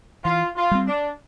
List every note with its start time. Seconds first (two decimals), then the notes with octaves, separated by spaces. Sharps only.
0.25 E3 F4
0.56 F4
0.71 G3 C4
0.87 D4